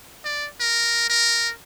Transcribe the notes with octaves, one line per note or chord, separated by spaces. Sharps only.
D5
A#4
A#4